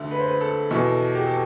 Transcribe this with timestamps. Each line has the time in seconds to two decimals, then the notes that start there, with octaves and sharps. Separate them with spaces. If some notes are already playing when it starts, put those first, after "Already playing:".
Already playing: D2 D3
0.11 B4
0.20 C5
0.27 B4
0.41 A4
0.71 E2 B2 A4
1.15 G4
1.27 A4